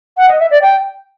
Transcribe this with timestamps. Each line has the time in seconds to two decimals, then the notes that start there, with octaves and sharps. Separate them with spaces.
0.17 F#5
0.28 D#5
0.39 E5
0.51 D5
0.62 G5